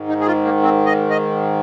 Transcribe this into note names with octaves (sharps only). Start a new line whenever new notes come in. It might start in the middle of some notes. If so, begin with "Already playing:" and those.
Already playing: G#2 D#3
D#4
G#4
F4
A#3
C4
D#5
D#5